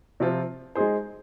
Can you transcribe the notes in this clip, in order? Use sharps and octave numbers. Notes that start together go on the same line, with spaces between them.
C3 F3 C4 F4
G#3 D#4 G#4 C5